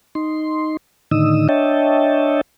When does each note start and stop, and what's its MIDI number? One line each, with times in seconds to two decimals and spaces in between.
0.15 0.77 63
0.15 0.77 84
1.11 1.48 45
1.11 1.48 50
1.11 1.48 51
1.11 1.48 63
1.11 1.48 87
1.11 1.48 88
1.49 2.41 62
1.49 2.41 73
1.49 2.41 75
1.49 2.41 76
1.49 2.41 79
1.49 2.41 81